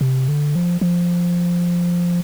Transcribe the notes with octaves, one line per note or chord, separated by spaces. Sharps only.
C3
D3
F3
F3